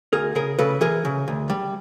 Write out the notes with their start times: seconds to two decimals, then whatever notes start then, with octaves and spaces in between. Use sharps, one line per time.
0.13 D2 G#4 A#4
0.35 C#3 G#4 A#4
0.59 C#3 A4 B4
0.81 E3 G#4 A#4
1.05 C#3
1.28 D2
1.50 G3